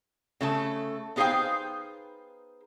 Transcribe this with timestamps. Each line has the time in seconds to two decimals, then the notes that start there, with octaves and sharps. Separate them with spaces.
0.41 C#3 A3 A4
1.16 B3 D#4 G#4 C5 F5 G5